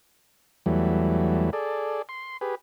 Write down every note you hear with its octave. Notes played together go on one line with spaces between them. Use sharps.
E2 E3 F#3 G3 A3
G#4 A4 D5
C6
G4 G#4 B4